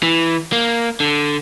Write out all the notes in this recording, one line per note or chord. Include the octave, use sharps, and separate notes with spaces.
E3
A#3
D3